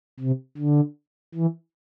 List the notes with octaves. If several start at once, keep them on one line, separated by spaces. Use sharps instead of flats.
C3
D3
E3